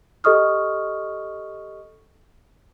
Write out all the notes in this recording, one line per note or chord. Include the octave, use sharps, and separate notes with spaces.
G4 A4 D#5 C#6 D#6 F6